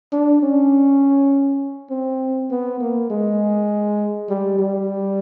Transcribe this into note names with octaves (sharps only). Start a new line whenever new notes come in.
D4
C#4
C4
B3
A#3
G#3
G3
G3